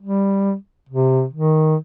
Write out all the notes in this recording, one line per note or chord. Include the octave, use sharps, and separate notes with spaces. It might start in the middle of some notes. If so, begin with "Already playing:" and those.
G3
C3
D#3